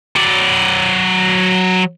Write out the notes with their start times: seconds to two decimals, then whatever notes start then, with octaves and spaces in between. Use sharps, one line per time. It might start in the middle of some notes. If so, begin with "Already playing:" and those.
0.16 F#3 D5